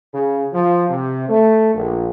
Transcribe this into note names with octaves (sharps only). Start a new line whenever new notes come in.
C#3
F3
C3
A3
A#1